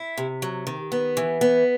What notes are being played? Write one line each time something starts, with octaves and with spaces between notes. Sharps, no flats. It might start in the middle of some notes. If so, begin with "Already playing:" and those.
Already playing: E4
C3
F#3
D#3
B3
E3
B3